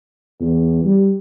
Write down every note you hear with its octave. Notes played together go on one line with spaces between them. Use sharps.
E2
G3